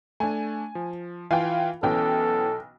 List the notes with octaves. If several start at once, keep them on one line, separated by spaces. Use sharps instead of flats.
A3 D4 G#5
F3
E3 F4 F5 G5 G#5
B1 E3 B3 C#4 A4 G5